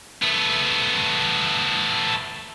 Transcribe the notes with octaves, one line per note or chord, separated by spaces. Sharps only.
A3 B3